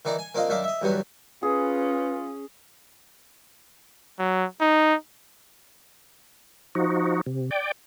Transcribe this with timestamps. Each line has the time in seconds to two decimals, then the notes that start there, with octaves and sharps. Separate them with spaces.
0.05 D#3 E3 D#4 D5 A#5
0.19 G#5
0.35 A#3 C4 D4 F4 D#5 F5
0.49 F#2 D#3 D4 E5 F5 D6
0.64 D#5 E5
0.82 E2 G2 D3 F#3 G3 B3
1.43 C#4 F4 G#4 B4
4.19 F#3
4.61 D#4
6.75 F3 D#4 F#4
7.26 C3
7.51 D5 G5